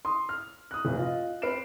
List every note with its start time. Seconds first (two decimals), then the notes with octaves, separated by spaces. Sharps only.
0.05 C6 D#6
0.29 F6
0.71 D#6 F#6
0.85 F1 A#2
0.99 F4 D#5
1.42 C4 B4 F6 C7 D7 E7